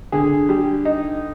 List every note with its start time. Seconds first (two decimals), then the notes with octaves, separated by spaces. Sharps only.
0.12 D3 G#4
0.49 G3
0.85 D#4